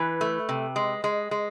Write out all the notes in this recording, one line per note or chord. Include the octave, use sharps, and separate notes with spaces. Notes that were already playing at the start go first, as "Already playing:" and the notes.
Already playing: E3 B4
A3
C3
G#3
G#3
G#3